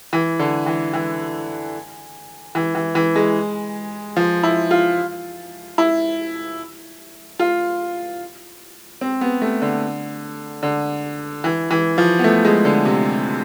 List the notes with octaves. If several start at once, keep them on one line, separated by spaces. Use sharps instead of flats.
E3
D3
E3
E3
E3
E3
E3
G#3
F3
E4
F4
E4
F4
C4
B3
A3
D3
D3
E3
E3
F3
B3
A3
G#3
D3
C3